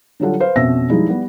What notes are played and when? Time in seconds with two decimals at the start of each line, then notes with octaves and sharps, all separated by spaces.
0.20 D3 F#3 G3 F4 A4 F#5
0.40 B4 C5 F5
0.56 F2 B2 C#4 E5 E6 A#6
0.90 F3 G3 G#3 D#4 E4
1.08 G3 B3